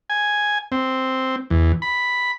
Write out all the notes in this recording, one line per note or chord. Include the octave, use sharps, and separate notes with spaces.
G#5
C4
E2
B5